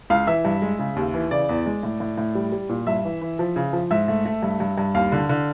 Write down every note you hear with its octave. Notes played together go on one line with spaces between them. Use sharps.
C#2 F5
E3 E5
G2
G#3
C#3
D#2
E3
C#3 D5
E2
G#3
A2
A2
A2
G3
G3
A#2
G2 E5
E3
E3
F3
C#3
F3
G#2 E5
A3
A3
G2
G2
G2
D#2 F5
D3
D3